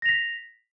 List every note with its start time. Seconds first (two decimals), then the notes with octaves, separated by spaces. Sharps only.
0.02 A#6
0.06 F7
0.09 B6